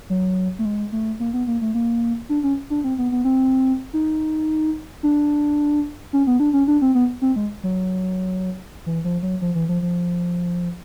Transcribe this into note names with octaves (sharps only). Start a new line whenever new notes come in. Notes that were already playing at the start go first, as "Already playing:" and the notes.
F#3
A3
G#3
A3
A#3
B3
A#3
A3
A#3
D4
C#4
D4
C4
B3
B3
C4
D#4
D4
C#4
B3
D4
C#4
D4
C4
B3
C4
G#3
F#3
E3
F3
F#3
F3
E3
F3
F3